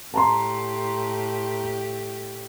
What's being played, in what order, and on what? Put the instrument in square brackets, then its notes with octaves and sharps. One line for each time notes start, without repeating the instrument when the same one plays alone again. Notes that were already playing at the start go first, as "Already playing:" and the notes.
[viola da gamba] A2 G4 [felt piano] A5 A#5 C6